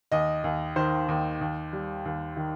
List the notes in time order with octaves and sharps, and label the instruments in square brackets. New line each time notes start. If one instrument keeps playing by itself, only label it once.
[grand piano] D#2 D#5
D#2
D#3 C5
D#2
D#2
G3
D#2
D#3